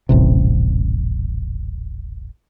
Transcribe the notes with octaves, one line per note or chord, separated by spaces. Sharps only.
D#1 A1 C3